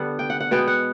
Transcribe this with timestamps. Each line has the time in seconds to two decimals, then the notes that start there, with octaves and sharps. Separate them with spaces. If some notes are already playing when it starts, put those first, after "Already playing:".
Already playing: D3 G3 B3 F#5
0.19 G5
0.30 F#5
0.40 F#5
0.51 B2 G#3 B3 G5
0.67 F#5